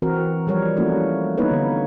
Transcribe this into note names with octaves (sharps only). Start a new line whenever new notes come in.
E3 C4 F#4 A#4
F3 G3 A#4 C#5
A3 A#3 C#4 E4 F#4
A#3 B3 D#4 E4 B4 C#5
D3